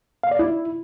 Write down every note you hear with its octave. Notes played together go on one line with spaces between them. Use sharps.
F5
D5
E4